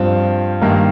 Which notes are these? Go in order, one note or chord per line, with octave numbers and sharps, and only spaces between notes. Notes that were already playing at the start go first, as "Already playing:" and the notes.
Already playing: G2 F3 C4 F4
G2 D#3 A#3